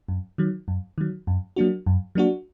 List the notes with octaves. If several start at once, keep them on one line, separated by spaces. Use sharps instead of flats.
F#2
D#3 F#3
F#2
D#3 F#3
F#2
F#3 A#3 D4 F#4
F#2
F#3 A#3 D4 F#4